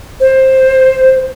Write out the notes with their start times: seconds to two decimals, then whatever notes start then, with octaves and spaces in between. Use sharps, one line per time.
0.20 C5